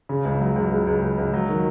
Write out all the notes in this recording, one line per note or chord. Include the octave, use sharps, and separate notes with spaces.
C#3
C#2
F#3
C#2
C#2
C#2
C#2
C#2
F#3
D#3